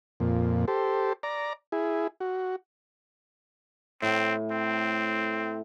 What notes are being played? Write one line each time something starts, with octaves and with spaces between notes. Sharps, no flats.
F2 A#2
G4 A4 C5
D5 A#5
E4 G#4
F#4
A2 C4
C4